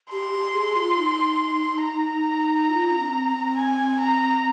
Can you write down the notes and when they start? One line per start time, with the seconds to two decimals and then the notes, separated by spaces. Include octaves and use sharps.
0.11 G4 C6
0.33 G4
0.54 G#4
0.76 F4
0.98 D#4
1.83 A#5
2.69 F4
2.91 D4
2.99 C4
3.28 C4
3.56 G#5
3.99 A#5